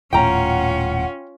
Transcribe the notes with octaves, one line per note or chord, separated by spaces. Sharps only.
D#1 A2 C#4 F4 F#5 G5 A#5